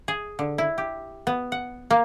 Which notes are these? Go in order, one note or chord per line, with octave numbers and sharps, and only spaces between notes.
G#4
D3
E4
G4
B3
F#5
A#3